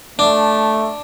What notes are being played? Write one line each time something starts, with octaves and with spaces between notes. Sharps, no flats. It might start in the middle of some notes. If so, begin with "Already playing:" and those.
A3 D4